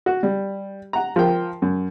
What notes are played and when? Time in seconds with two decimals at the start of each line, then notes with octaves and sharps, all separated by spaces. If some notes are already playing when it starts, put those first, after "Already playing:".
0.06 F#4
0.23 G3
0.93 F#5 A#5
1.16 F3 A#4 G5
1.62 F#2